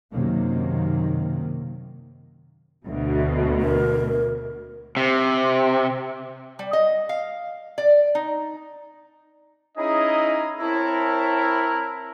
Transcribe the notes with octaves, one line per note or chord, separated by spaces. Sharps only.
F#2 C3 D#3 A#3
D2 B2
A#4
C3
G3
D#5
F5
D5
D#4
C#4 D#4 E4 G#4 D#5 A#5
C4 E4 A#4 C#5 A5